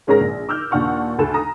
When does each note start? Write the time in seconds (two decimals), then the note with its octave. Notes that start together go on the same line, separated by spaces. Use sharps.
0.07 G#2 G#3 C#4 G#4 A#4 A#6
0.20 A#1
0.49 D6 E6 F6 G6
0.71 D#2 A#2 D4 F#5 C#6 F6
1.18 D2 A4 E7
1.34 A#5 D#6 A#6